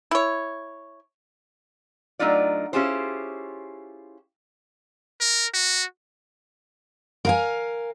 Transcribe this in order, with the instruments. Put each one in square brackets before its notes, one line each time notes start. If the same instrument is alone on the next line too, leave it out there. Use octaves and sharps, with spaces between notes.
[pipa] E4 C#5
[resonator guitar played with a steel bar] F#3 A3 D4 D#4 F4 D5
C#4 E4 F4 G4 G#4 C5
[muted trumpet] A#4
F#4
[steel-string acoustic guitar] A#4 F5 G#5